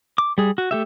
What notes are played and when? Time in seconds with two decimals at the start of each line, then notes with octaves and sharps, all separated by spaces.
0.18 D6
0.38 G3 G#4
0.58 F#4
0.71 A3 G4 E5